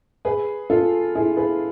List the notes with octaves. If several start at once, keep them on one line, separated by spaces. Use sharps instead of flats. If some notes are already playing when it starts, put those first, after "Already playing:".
G#4 B4
F4 A4
E4 G#4
G#4 B4